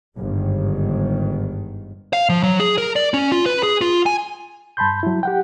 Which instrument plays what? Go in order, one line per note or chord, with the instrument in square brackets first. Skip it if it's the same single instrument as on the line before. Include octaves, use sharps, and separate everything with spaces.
[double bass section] G1 G#2 D#3
[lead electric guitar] F5
F3
F#3
G#4
A#4
D5
C#4
F4
B4
G#4
F4
G#5
[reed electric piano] G2 A5 B5 C6 G6
F#3 E4
G4 F#5 G5